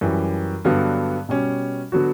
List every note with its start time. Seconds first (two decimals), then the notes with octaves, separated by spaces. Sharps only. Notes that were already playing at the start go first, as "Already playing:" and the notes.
0.01 F#2 E3 G3
0.65 G2 D3 F#3 B3
1.29 B2 G3 C#4
1.92 D3 F#3 B3 F#4